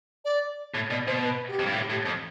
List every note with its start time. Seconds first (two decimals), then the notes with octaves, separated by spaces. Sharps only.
0.25 D5
0.74 A2
0.90 B2 D5
1.07 B2 C5
1.23 B4
1.48 G4
1.59 F2
1.66 G2
1.73 A2
1.90 A2
2.05 F2